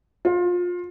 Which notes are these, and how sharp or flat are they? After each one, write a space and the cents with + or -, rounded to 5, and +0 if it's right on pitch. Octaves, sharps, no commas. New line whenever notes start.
F4 +25